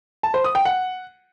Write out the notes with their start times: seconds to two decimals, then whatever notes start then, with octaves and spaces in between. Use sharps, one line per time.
0.23 A5
0.34 C5
0.44 D#6
0.55 G5
0.65 F#5